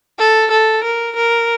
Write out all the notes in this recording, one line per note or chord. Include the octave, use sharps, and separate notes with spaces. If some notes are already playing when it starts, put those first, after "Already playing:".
A4
A4
A#4
A#4